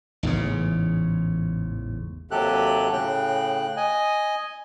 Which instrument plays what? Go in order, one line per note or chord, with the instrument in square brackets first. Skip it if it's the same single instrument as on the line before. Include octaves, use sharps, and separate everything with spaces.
[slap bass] A1 E2 G#2 C#3
[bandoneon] D#2 C3 F#3 G4 A4 F#6
A2 C#3 G5 F#6
D#5 G#5